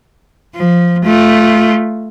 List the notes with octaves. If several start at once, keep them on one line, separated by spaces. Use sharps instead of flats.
F3
A3 F4